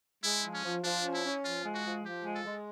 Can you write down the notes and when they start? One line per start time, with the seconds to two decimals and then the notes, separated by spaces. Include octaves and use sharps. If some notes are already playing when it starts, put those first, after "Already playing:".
0.24 G#3 E4
0.43 F3
0.54 C#4
0.64 F3
0.84 F3 D4
1.04 C#4
1.14 E4
1.24 C#4
1.44 F3 F4
1.64 G#3
1.74 F#4
1.85 F3
2.04 F3 G4
2.25 G#3
2.35 A4
2.45 G#3